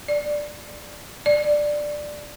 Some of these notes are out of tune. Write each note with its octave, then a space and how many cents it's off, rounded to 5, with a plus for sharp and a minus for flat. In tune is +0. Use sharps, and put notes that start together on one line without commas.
D5 +0
D5 +5